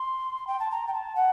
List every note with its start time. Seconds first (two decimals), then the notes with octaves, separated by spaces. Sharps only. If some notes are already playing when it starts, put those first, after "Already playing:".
Already playing: C6
0.47 G5
0.59 A5
0.70 A#5
0.87 G5
0.93 A5
1.15 F#5